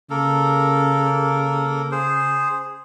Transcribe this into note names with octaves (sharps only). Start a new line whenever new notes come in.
C#3 A#3 A4 A#4
G#4 C5